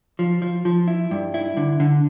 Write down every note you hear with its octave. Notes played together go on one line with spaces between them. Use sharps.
F3
F3
F3
E4
G2
E4
D3
D3